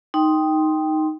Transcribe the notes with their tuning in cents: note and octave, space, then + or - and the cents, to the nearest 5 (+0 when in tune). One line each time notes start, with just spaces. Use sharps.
D#4 +0 G5 +0 C6 +0